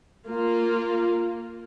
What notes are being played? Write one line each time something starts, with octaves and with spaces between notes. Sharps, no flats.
A#3 F4